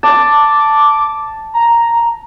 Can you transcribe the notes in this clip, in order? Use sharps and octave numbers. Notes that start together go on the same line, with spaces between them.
A5 D6
A#5